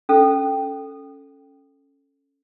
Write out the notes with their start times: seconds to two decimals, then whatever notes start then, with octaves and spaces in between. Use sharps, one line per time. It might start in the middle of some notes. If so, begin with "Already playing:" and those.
0.09 C#4 A4